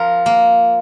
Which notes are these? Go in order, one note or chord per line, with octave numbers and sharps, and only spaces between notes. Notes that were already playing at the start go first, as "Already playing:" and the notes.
Already playing: F3 A#4
A#3